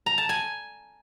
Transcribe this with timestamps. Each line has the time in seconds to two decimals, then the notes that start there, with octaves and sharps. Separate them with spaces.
0.06 A#5
0.18 A5
0.29 G#5